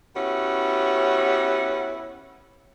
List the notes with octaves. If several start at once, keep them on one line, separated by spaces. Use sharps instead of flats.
B3 C#4 E4 F#4 G4